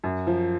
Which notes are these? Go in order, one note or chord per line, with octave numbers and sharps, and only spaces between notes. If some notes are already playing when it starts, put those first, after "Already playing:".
F#2
F3